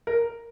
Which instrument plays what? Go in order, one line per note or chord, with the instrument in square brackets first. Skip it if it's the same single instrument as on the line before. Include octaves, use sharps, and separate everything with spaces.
[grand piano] A#4